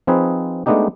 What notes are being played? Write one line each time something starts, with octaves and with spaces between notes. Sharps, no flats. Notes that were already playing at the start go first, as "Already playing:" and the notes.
F3 C4 D#4 G#4 B4
G#3 A3 B3 D4 D#4 G4